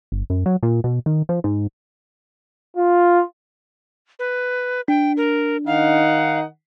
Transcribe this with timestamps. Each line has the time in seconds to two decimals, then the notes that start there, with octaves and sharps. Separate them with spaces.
0.12 G1
0.30 F#2
0.46 F#3
0.63 A#2
0.84 B2
1.06 D#3
1.29 F3
1.44 G#2
2.77 F4
4.19 B4
4.88 D4 G5
5.17 A#4
5.67 D#3 D#4 F5 F#5